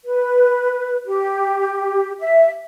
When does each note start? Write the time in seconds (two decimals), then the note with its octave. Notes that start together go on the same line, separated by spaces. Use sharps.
0.05 B4
1.07 G4
2.20 E5